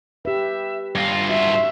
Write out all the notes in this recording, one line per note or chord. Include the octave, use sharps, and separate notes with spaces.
G4 B4 E5
G2 F4 A#6
F#4 E5 C6